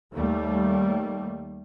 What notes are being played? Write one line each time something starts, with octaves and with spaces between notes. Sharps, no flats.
D#2 G3 A3